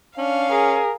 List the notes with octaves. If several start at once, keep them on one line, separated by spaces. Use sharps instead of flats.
C#4 D4 F5
G#4 A#4